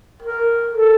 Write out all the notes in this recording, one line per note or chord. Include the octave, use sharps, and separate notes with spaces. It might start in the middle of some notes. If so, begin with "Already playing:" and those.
A#4
A4